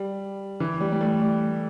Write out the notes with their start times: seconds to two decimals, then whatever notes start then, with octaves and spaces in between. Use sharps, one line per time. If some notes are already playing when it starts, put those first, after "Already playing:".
Already playing: G3
0.60 E3
0.80 G3
0.92 G3
1.01 A3
1.22 G3